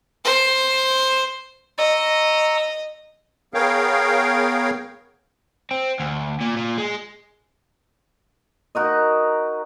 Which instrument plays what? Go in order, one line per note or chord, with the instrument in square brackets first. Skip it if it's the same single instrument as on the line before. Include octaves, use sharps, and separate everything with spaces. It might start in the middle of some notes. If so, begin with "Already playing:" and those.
[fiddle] C5
[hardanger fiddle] D#5 [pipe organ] A#5 C#6 E6
[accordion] B3 G#4 A#4 C#5 F5 G5
[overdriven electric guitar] C4
D2
A#2
A#2
G#3
[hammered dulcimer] D#4 F#4 A#4 D#5